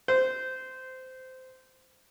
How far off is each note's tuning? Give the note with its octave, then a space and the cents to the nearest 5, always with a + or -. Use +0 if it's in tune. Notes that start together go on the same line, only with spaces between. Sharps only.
C5 -15